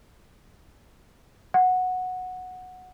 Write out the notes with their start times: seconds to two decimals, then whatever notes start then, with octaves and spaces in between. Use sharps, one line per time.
1.54 F#5